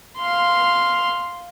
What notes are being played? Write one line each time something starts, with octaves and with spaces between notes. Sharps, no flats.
F5 C6